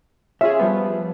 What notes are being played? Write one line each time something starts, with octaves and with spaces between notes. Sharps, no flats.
C#4 F4 G#4 E5
F3 G3 B3